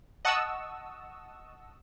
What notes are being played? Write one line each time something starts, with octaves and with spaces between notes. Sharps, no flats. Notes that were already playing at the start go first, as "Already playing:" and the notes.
D#5 F#5 A5 C#6 D#6 E6